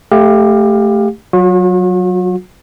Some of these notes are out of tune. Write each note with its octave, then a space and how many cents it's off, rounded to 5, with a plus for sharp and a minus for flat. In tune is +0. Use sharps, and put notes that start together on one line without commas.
A3 -5 G4 +20 F5 +20
F#3 +0 F#4 -45